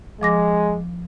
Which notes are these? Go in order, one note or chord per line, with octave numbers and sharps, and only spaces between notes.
F3 G#3 D6 A#6